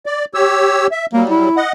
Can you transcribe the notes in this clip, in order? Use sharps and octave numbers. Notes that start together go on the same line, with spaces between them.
D5
G4 C#5 E6
E5
F#3 G3 A#3
E4
D#5 F#5